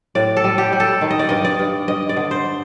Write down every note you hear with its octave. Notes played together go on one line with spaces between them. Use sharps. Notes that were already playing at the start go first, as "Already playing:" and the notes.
A2 D5
A4
G3
G4
G3
A4
D#3
D#5
D5
G2 D#5
D5
G2
G2 D#5
D5
D3
C5